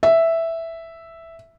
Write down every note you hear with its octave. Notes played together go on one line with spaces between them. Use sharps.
E5